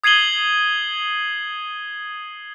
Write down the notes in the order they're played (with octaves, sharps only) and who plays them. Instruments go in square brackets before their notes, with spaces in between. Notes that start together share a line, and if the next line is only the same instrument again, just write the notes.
[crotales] D#6 G#6 C7 D#7 F#7 G7